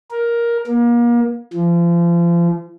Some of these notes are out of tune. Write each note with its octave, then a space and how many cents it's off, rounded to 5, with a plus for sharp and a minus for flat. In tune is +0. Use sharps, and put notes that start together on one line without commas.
A#4 +10
A#3 +35
F3 -35